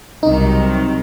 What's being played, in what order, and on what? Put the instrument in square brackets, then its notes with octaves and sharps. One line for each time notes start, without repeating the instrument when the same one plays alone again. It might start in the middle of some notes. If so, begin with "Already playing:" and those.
[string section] C2 C3 D#3 F#3 [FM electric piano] D#4